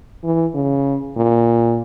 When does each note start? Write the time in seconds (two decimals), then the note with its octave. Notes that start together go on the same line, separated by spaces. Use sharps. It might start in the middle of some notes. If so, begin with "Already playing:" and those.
0.24 E3
0.54 C#3
1.17 A#2